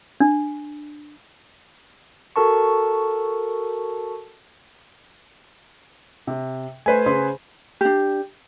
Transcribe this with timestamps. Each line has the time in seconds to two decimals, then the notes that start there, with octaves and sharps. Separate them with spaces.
0.20 D4
2.36 F#4 A4 A#4 A5 C#6
6.27 C3
6.86 A3 B4 C5 G#5
7.06 C#3 C5 C6
7.81 D4 G4